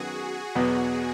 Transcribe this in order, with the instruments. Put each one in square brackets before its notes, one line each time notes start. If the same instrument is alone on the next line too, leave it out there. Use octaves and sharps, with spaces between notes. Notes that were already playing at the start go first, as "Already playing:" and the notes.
Already playing: [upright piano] F#2 D#3 F#3 B3 [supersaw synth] F#4 G#4
[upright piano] E2 B2 F#3 B3